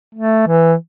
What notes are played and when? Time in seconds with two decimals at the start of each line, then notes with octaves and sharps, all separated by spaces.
0.15 A3
0.47 E3